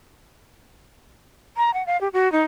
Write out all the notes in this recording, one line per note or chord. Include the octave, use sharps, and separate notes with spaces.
A#5
F#5
F5
G4
F#4
D#4